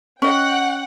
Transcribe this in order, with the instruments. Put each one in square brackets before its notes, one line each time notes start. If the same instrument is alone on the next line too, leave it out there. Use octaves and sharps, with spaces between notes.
[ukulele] C#4 D#5 [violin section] F#5 G5